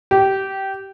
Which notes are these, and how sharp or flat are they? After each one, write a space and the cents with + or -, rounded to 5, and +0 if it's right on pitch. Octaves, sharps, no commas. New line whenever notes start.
G4 -20